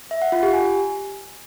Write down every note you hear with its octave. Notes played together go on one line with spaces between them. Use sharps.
E5
F#5
F4
G4
G#5